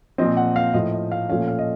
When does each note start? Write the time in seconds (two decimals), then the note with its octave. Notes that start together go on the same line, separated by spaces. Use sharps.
0.18 A#2 F3 C4 D#5
0.37 F#5
0.56 F5
0.73 A2 F3 A#3 D#5
0.92 D#5
1.12 F5
1.29 A#2 F3 A3 C#4 F5
1.48 F5
1.59 D#5